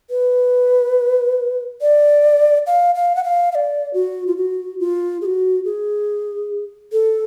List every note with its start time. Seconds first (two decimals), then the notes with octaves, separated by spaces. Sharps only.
0.10 B4
1.81 D5
2.67 F5
2.95 F5
3.16 F#5
3.24 F5
3.52 F5
3.55 D5
3.94 F#4
4.27 F4
4.37 F#4
4.80 F4
5.21 G#4
5.26 F#4
5.65 G#4
6.92 A4